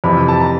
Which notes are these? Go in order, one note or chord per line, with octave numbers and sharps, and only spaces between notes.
F2 C3 E3 B5
A5
A#5